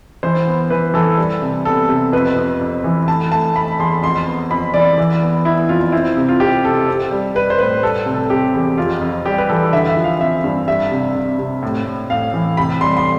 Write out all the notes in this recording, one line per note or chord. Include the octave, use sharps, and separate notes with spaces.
E3 C5
B3
E3 B4
E3 A4
G3
C3
B3 A4
C3
F2 B4
F2
F2
E3
A3 A5
A3 A5
A3 B5
E2 C6
F2 C6
B3
F2 B5
E3 D5
E3
B3
B3 E4
F2 F4
C4 E4
C3
F4
C4 G4
C3 A4
C4
G3
G3 B4
C5
A2 B4
G3 A4
C3
A4
C3 G4
E2
F2 F4
F2
G3 G4
B4
E3 A4
D3 E5
E5
F3
F5
C4 E5
G2
G3 E5
C3
C3
C3
A2
A2
A2 F5
E3
C3 B5
G3 C6
C6